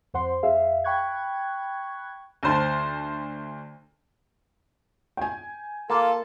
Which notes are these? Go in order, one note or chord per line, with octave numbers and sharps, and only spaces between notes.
F2 C5 F#5 C6
F2 G#4 E5 F5
G5 B5 C#6 F#6 G#6
D2 C5 A5
G5 G#5
A#3 F4 A4 A5